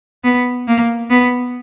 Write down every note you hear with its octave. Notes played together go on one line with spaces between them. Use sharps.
B3
A#3
B3